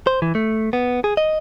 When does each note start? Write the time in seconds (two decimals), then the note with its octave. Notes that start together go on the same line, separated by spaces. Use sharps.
0.07 C5
0.22 E3
0.35 A3
0.73 B3
1.04 G#4
1.17 D#5